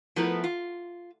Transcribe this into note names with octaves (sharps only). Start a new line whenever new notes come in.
F3 A3 B3 E4 A#4 B4
F4